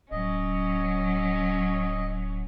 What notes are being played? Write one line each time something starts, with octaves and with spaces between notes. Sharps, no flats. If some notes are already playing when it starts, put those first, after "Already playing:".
D1 F#3 C#4 D#5